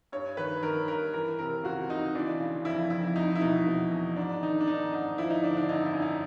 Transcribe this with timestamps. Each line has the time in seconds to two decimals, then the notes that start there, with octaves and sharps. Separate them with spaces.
0.12 G2 C#5
0.37 D#3 B4
0.63 D#3 A#4
0.88 G2 A#4
1.13 E3 A#4
1.39 C3 A#4
1.64 C#2 F#4
1.89 C#2 D#4
2.15 E3 D4
2.40 C#3
2.65 F2 E4
2.90 F2 E4
3.03 E4
3.16 E2 D#4
3.35 E4
3.41 B2 D#4
3.66 B2
3.91 E2
4.16 G#2 D4
4.42 D#3 D#4
4.60 D4
4.67 D#3 D#4
4.92 G#2 D#4
5.18 F3 E4
5.30 D#4
5.43 D3 D4
5.57 D4
5.69 F#2 D#4
5.86 E4
5.94 F#2
6.02 D#4